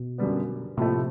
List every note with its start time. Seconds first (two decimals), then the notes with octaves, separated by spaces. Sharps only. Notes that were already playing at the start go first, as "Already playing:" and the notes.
Already playing: B2
0.18 F#2 D3 G3 B3
0.77 A2 C3 F3 A3